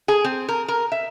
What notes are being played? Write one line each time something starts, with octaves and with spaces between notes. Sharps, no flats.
G#4
C4
A#4
A#4
E5